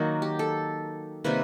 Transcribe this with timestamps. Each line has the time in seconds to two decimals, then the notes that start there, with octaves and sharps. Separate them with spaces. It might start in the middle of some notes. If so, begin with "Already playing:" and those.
Already playing: D#3 F#3 A#3 F#4
0.22 G4
0.39 A4
1.24 C3 D#3 G3 A#3 B4